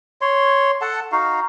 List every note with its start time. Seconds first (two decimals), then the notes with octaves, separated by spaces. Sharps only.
0.21 C#5 C6
0.81 A4 F#5 A5
1.12 D#4 F#4 F5